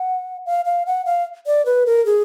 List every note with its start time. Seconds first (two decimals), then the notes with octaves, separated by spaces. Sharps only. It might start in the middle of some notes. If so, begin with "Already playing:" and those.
Already playing: F#5
0.46 F5
0.65 F5
0.86 F#5
1.06 F5
1.46 D5
1.66 B4
1.86 A#4
2.06 G#4